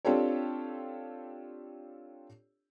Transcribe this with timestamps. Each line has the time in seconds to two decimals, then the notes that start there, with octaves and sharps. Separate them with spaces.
0.05 C4 D4 F4 G4 A4 C#5